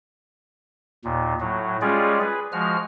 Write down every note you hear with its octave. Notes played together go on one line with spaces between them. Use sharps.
D#2 A#2
A2 F#3
G3 G#3 C#4 F4 G#4 D5
G#4 B4
F3 G#3 F#4 F6